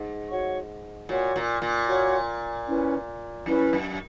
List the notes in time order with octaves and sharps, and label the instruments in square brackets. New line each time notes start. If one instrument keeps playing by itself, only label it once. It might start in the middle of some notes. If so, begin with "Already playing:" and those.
Already playing: [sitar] G#2
[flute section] F#4 C#5 F#5 C#6
[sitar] A#2 [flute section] F#4 C#5 F#5 C#6
[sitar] A#2
A#2
[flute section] F#4 C#5 F#5 C#6
C#4 E4 B4
[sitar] F#2 [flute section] C#4 E4 B4
[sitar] F#2